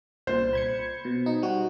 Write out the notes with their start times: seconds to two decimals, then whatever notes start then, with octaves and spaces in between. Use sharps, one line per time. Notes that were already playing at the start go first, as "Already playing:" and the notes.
0.27 C2 A#2 C5
0.53 B5 G#6 C#7
1.05 B2
1.26 D#4
1.42 G3 F#4